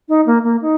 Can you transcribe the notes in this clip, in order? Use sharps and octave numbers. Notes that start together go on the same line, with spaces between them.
D#4
A#3
A#3
D#4